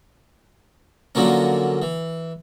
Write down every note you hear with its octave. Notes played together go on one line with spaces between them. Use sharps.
D3 F3 F#3 A#3 C#4
E3